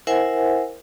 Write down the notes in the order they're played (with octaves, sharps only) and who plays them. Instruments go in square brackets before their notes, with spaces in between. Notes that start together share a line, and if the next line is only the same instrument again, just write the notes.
[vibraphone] E4 A#4 C5 E5 F#5 G#5